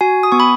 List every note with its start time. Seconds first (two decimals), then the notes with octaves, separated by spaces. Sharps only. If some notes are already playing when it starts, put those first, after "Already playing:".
0.01 F#4 G#5
0.23 D#6
0.32 B3 C#6
0.40 B5